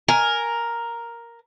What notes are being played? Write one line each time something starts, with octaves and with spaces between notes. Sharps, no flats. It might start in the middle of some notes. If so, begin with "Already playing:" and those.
A#4 G#5